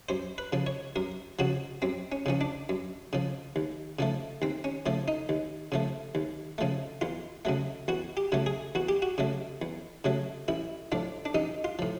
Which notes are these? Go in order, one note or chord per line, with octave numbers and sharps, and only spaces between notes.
F#2 C5
B4
C#3 F3
C#5
F#2 A#4
C#3 F3 F#4
F#2 C4
C#4
C#3 F3 C#4
D4
F#2
C#3 F3
D#2
C#3 F3 A3
D#2 C4
C#4
C#3 F3 A3
D#4
D#2
C#3 F3 A3
D#2
C#3 F3 A3
E2 F4
C#3 F#3 A3
E2 F#4
G4
C#3 F#3 A3
G#4
E2 F#4
G4
F#4
C#3 F#3 A3
E2
C#3 F#3 A3
A1 E4
A2 F3 D4
D4
A1 D#4
F4
A2 F3